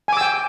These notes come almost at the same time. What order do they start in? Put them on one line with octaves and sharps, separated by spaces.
G#5 D6 E6 G5